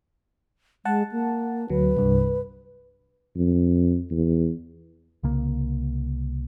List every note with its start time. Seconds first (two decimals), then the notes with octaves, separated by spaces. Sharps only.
0.85 G#3 F#5 A5
1.12 A#3
1.70 D2 F#3 B4
1.97 C2 G2
3.36 F2
4.11 E2
5.23 C2 C#3 A#3